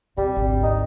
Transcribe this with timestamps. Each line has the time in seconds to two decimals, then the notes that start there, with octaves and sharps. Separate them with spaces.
0.17 C#2 C3 G3
0.36 G#1 D2
0.63 D#4